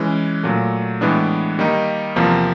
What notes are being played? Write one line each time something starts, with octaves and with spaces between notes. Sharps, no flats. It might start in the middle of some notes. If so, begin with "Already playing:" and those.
Already playing: E3 G#3 C#4
A#2 F#3 A3
A2 E3 G#3 B3 D4
D#3 G3 A#3 D#4
E2 C3 F3 A#3